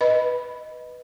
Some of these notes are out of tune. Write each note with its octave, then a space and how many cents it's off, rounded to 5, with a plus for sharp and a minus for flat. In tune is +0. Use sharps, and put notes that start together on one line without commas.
B4 +0 D#5 +0 B5 +0